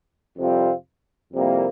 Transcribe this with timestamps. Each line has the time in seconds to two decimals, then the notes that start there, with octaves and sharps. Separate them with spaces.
0.38 F2 C3 G3 C4 F4
1.33 F2 C3 G3 A#3 E4